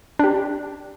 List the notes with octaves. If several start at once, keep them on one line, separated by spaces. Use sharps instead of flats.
D4 G4